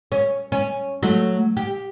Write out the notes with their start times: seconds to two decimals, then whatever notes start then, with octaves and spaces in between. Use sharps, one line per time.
0.12 C#4
0.52 C#4
1.03 F#3 A3
1.57 G4